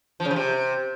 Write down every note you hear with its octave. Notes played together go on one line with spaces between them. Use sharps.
F3
C#3
F3
C3